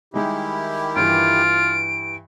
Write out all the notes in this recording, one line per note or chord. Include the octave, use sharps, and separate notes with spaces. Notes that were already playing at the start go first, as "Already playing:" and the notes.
D#3 G3 G#3 D#4 E4 G4
G2 E3 F4 D7